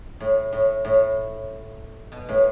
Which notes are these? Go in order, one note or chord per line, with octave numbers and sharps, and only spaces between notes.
A2
A2
A2
B2
A2